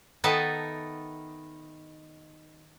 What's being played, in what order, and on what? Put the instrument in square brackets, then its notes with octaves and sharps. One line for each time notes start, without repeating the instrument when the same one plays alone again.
[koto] D#3 B3 D#4 A4 E5 A5